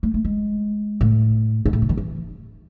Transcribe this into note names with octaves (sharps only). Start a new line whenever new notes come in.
A3
A3
G#3
A2
G#2
A2
C3
D#3
E3